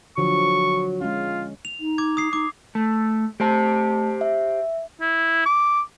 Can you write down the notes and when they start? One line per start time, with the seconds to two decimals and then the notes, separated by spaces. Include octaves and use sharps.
0.18 D3 F3 F#3 C#6
1.01 G#3 C#4 F4
1.65 F7
1.80 D#4
1.98 D6 G#6
2.17 D#6 C7
2.33 D#4 D6
2.75 A3
3.40 A3 G4 C5 A5
4.21 E5
5.00 E4
5.46 D6